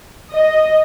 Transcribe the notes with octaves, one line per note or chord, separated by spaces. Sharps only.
D#5